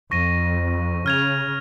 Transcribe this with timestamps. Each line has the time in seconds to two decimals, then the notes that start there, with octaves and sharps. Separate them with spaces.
0.11 F2 C#6 A#6 D#7
1.06 C#3 F6 G#6 F7